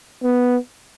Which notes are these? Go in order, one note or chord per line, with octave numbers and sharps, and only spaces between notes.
B3